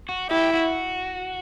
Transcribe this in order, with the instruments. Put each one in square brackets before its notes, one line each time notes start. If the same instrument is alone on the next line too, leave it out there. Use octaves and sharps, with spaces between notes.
[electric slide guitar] F#4
[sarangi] E4 [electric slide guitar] G4
[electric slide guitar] F#4